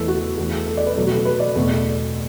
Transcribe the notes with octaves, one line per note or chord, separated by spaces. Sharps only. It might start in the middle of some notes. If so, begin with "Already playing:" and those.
Already playing: E2 E3 A3 A4 B4
F#4
E2 E3 A3
A4
D5
B4
B2 F#3 A3 A4
F#4
A4
B4
D5
E2 B2 A3